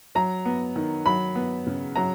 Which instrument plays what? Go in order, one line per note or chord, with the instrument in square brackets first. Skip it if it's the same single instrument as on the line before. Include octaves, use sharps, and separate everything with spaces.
[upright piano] F#3 A#5
B3
D#3
F#3 B5
B3
C#3
F#3 A#5